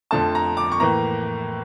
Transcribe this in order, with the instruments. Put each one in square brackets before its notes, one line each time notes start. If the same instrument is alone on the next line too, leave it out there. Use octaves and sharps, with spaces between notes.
[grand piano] F2 D3 F3 A3 A5
A#5
D6
C#6
A2 E3 A#3 A#5